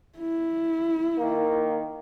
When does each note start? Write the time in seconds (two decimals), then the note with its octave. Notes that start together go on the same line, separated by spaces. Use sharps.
0.19 E4
1.17 D#3 A#3